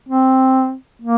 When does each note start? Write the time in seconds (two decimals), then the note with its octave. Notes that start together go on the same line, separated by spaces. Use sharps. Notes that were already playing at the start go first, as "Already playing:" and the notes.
0.09 C4
1.02 A#3